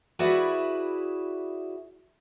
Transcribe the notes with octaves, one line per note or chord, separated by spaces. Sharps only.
E4 F#4 G#4 B4 D5 E5